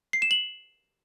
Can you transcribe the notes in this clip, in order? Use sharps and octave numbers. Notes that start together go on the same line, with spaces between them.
C7
E7
F#7